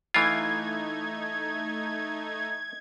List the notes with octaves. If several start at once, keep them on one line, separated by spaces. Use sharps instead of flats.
E3 A3 D#4 F4 G#6